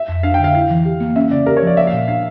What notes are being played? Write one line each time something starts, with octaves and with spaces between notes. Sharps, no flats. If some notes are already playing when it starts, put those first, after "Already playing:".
Already playing: E5
F2
D4 F5
D3 G5
F5
E4 F5
E3
G4
A#3
C#4 E5
C#3 D5
G4 A#4
C#5
F3 D5
A#3 E5
F5
A#2
D4 F5